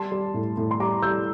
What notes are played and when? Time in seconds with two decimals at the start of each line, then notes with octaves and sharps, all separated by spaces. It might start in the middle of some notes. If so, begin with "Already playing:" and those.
Already playing: G3 A5 C6
0.12 G3
0.34 A2
0.57 A2
0.71 C6
0.80 G3 A#5 D6
1.02 G3 E6 G6